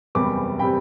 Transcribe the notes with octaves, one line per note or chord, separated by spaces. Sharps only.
F#1 E2 C3 G3 B5 D6
C3 G3 G5 B5